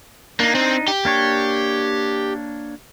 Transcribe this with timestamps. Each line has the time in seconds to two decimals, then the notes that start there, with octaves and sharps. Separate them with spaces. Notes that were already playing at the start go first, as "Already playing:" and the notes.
0.40 A#3 D4 D#4
0.55 C4
0.88 G4
1.05 A#3 D4 C#5